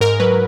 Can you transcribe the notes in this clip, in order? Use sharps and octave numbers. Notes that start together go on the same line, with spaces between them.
G#2 A#4
F#3 B4